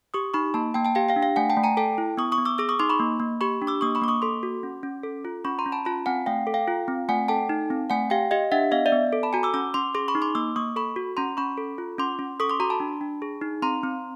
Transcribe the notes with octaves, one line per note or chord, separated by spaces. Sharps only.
G4 C#6 D#6
D#4 B5 C#6
A#3 A5 B5
A#3 G5 A5
G5 A5
G4 F5 G5
F5 G5
D4
F5 G5
A3 F#5 G#5
G5 A5
A3
G#5 A#5
A4 G5 A5
E4
B3 C#6 D#6
C#6 D#6
B3
D6 E6
G#4 D6 E6
C#6 D#6
D#4 C6 D6
B5 C#6
A#3
A#3
G4 B5 C#6
D4
D6 E6
A#3 C#6 D#6
B5 C#6
A#3 D6
C#6 D#6
A4 C6 D6
F#4
C#4
C#4
A4
F4
C#4 B5 C#6
A#5 C6
C#4
A5 B5
F4 A5 B5
C4 F#5 G#5
A3 F5 G5
A4
F5 G5
F4
C4
A3 F#5 G#5
A4 G5 A5
D#4
C4
A3 F#5 G#5
G4 F5 G5
G4 D#5 F5
D4 E5 F#5
B3 D#5 F5
D5 E5
B3
A4
A5 B5
F#4 G#5 A#5
D6 E6
C#4 D6 E6
C#4 C6 D6
G#4 C6 D6
B5 C#6
D#4
C6 D6
A#3 D6 E6
A#3 C#6 D#6
A4 B5 C#6
F#4
C#4 A#5 C6
C#4 B5 C#6
A4
F4
C#4 C6 D6
C#4
A4 C#6 D#6
C6 D6
F#4 A#5 C6
A5 B5
D4
D4
G#4
D#4
C4 A#5 C6
C4